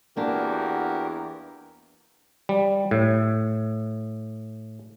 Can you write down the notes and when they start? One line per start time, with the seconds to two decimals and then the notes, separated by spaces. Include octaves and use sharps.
0.17 E2 A#3 D4 F#4 G4 A#4
2.49 G3
2.91 A2